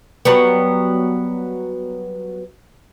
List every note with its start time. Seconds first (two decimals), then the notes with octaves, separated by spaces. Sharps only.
0.25 F#3 G3 B3